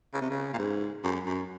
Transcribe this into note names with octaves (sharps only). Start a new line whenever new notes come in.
C#3
C3
C#3
A#2
G#2
F#2
F#2